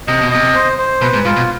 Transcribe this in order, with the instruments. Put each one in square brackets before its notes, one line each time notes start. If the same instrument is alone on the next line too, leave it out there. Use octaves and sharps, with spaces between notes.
[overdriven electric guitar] C3 [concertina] D#5
[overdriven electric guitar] B2
[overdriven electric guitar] C3 [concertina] D#5
[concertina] C5
C5
[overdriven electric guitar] B2 [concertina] B4
[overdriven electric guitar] G#2
[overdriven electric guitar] G#2 [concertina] F4
[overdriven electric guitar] B2